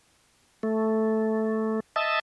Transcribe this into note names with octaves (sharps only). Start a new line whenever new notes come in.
A3
D#5 E5 A5